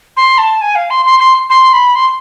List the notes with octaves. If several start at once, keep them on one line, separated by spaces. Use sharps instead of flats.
C6
A5
G#5
F5
C6
C6
C6
C6
B5
C6